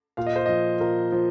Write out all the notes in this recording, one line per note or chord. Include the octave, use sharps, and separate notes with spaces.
A#2 F5
D#5
C5
F3 D#5
A#2 A#4
F3